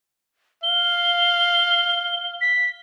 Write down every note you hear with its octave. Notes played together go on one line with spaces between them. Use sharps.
F5 G7
B6